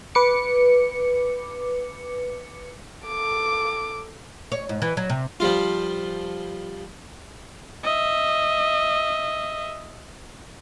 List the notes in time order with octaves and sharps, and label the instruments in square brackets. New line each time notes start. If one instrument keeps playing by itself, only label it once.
[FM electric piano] B4 D6 C#7
[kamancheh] A4 D6
[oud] C#5
G#2
E3
F#3
C3
[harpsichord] F3 G3 F4
[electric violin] D#5 E5